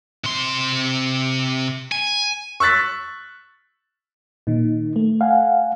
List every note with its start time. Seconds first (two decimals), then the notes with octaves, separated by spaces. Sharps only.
0.24 C3 C6
1.92 G#5
2.60 C#6 E6 F#6 A6 B6
4.47 A#2 D#3 D#4
4.96 A3
5.21 F5 F#5 G#5